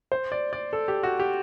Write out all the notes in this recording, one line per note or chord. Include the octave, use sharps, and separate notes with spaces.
C5
D5
D5
A4
G4
F#4
G4